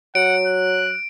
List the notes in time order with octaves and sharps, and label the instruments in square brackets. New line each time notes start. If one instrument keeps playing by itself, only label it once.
[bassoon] F#3 [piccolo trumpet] F#5 [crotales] D7
[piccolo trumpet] F#6